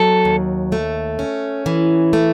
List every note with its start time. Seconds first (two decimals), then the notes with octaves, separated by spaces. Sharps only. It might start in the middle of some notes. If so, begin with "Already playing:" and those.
Already playing: F#3 A4
0.25 D#2
0.72 A3
1.19 C#4
1.66 E3
2.13 A3